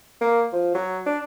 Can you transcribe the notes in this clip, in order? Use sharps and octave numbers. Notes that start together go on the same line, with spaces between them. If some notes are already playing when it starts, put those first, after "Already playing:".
A#3
F3
F#3
D4